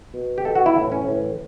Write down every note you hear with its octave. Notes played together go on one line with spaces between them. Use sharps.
B2
G4
B2 A4
F#4
E4
A2 E3
C#4
A2 E3